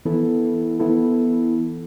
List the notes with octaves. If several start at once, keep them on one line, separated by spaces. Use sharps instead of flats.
E3 B3 E4 A4
E3 B3 E4 A4